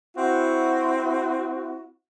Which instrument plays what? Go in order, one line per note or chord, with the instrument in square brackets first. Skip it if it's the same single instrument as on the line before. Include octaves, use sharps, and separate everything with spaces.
[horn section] C4 E4 F#4